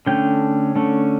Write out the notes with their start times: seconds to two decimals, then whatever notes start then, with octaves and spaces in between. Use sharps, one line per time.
0.07 D3 A3 C#4 G5
0.76 D3 A3 C#4